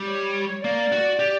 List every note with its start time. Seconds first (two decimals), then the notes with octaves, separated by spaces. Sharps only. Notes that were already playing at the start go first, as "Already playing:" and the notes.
Already playing: G3
0.08 C#5
0.64 A#3 D5
0.92 F#4
1.19 G4